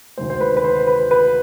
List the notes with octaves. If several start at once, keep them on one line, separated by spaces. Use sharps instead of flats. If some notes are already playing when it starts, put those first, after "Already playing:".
D2 C3 D#3 G#3 C5
C5
B4
B4
C5
B4
B4